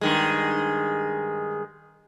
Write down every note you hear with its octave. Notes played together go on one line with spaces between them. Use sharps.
G2 D#3 G#3